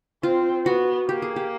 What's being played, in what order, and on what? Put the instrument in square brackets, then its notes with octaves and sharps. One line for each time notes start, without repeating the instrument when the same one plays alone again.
[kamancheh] C4 [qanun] F4
[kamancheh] B3 [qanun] F#4
[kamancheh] A#3 [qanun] G4
[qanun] G#4
G4